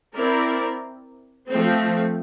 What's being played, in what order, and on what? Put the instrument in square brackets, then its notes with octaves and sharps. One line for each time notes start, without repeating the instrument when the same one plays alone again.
[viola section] C4 E4 A#4 D5
F3 A3 C4